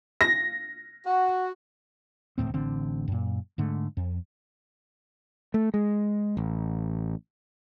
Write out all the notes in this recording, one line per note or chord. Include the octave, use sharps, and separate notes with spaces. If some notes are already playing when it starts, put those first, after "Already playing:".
A#6
F#4
D1 B1 A2 C4
A1 D3 C4
F#2 A#2
G#2 D3 A3
F2
A3
G#3
A1